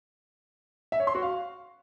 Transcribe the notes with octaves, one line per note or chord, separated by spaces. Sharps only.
E5
C#5
C6
F#4
F5